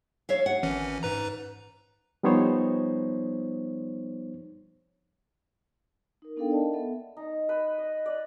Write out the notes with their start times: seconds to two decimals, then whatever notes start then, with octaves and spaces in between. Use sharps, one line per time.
0.29 C#5 E5 F5
0.46 F#5
0.63 G#1 E3 C#4
1.03 G#2 B4 A#5
2.23 F3 G3 B3 D#4 C5 C#5
6.22 D#4 A#4
6.37 B3 D4 D#4 A4 F5 G5
6.50 A#4 D5 D#5 A5
6.72 B3 A4 E5 F#5
7.17 D#4
7.49 B4
7.78 D#5
8.06 D5